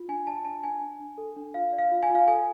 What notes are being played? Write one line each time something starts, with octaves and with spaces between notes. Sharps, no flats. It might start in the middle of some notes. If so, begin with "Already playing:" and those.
Already playing: F4
D4 G#5
D5 A5
D4 A5
D4 G#5
D4
D4
A4
D4
F4 F5
D5
F5
F4
G#5
F4
F5
A4 G#5